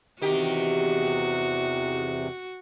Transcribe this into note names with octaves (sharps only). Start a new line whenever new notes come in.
E2 C3 D#3 F#4 G4